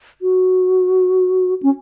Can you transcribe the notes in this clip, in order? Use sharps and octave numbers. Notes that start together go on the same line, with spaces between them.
F#4
C#4